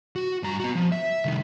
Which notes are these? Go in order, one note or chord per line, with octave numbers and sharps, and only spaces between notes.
F#4
G2 A#5
B3 F#4
F3
E5
C2 D#3